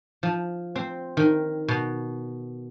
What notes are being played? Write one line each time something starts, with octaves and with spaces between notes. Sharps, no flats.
F3
C4
D#3
B2